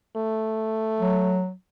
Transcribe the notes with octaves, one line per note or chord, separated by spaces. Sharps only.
A3
F#3